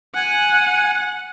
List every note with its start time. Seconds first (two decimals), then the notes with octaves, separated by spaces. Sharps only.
0.15 F#5 G#5